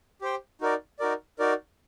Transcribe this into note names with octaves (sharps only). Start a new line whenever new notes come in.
G4 C5 G5
D#4 F#4 A#4 D5
D#4 F#4 A#4 D5
D#4 F#4 A#4 D5